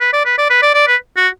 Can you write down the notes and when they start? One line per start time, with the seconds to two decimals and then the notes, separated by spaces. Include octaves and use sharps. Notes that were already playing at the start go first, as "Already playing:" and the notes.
0.01 B4
0.13 D5
0.25 B4
0.38 D5
0.50 B4
0.62 D5
0.74 D5
0.87 B4
1.16 F#4